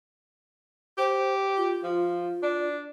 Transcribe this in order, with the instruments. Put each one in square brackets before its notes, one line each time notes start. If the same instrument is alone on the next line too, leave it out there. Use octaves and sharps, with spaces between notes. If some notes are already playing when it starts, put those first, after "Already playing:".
[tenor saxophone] G4 [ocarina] C5
[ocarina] F4
[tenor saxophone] F3
D4